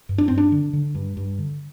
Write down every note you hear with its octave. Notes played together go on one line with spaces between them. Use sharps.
G2
D4
G2 C4
D4
D3
D3
G2
G2
D3